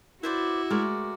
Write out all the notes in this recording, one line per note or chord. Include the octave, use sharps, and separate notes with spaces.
E4 F#4 B4 C5 D5
G#3 A3 A#4 C#5 D5